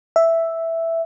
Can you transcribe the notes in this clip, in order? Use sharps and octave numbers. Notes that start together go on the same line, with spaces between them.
E5